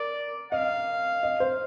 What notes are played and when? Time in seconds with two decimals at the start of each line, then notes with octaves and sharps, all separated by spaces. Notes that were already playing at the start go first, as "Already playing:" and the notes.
Already playing: A#4 D5
0.52 D#5 F5
1.23 D#5
1.40 C5